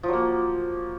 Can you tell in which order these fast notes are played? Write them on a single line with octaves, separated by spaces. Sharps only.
F3 F#3 A#3